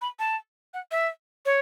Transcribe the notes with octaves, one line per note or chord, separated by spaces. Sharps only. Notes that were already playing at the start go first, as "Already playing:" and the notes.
B5
A5
F#5
E5
C#5